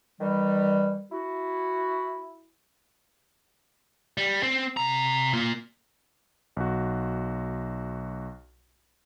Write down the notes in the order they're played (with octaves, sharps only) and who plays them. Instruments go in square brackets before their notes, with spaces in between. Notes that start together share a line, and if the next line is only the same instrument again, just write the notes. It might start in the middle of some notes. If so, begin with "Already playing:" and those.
[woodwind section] D#3 E3 G3
E4 F#4
[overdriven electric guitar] G3
C4
C3 A#5
A#3 F4
[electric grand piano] B1 F#4